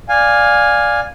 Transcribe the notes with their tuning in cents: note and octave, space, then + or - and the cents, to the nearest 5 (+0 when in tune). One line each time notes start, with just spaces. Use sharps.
D5 +0 F5 +15 G#5 -10